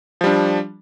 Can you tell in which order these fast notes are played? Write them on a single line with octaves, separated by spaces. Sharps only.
F3 G3 D4